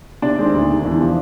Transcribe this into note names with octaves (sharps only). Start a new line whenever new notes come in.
C3 D4
D#3 G#3 C4
D2
C3 D#3
E2
C3 F3